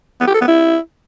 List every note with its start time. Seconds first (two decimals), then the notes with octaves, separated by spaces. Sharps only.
0.21 B3
0.28 G4
0.34 A4
0.41 B3
0.48 E4